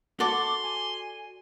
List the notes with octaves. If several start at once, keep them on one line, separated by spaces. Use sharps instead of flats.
F#4 A4 D5 C6 D6
G#5